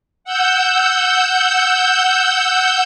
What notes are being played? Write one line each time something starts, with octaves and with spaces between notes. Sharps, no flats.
F#5 E6 G6